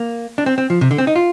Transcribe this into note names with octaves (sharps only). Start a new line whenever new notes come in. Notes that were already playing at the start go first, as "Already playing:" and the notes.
Already playing: A#3
D4
C4
C4
F3
C3
D3
C4
D#4
F4